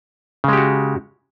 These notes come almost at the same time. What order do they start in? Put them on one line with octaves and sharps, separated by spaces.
C#3 G#3 G4 F#4